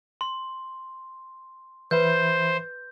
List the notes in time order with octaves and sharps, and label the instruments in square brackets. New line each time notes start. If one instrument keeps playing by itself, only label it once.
[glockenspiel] C6
[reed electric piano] E3 E5 B5 [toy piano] B4 [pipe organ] C5 [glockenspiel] G6